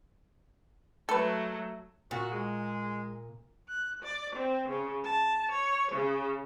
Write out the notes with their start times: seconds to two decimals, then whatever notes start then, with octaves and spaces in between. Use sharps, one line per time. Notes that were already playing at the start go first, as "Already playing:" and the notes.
1.09 F#3 A3 A4 B4
2.11 A#2 F#4
2.32 G#3
3.68 F#6
4.02 D5
4.35 C4
4.68 C#3
5.05 A5
5.51 C#5
5.91 C#3